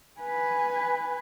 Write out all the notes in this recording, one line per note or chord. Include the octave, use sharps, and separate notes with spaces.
B4 G#5